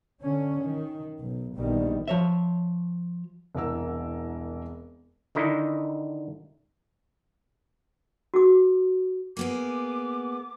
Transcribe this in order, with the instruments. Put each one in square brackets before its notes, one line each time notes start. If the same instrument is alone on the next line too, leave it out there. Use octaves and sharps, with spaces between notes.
[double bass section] D3 C#4
D#3
B1
A#1 D#3 G3 B3
[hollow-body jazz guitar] F3 C#5 E5
[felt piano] E1 C2 A#4 E6
[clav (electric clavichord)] D3 D#3 D#4 E4
[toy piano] F#4 G#4 D6
[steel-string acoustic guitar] A#3 B3 G#4 [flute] D6